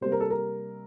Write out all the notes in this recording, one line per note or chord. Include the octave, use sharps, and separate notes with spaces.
C3 G3 A#3 C5
A#4
A4
A#4